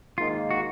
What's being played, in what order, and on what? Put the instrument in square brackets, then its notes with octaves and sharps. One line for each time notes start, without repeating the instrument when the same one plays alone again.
[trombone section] G#2 D#3 A#3 D#4 [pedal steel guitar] F4
[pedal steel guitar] F#4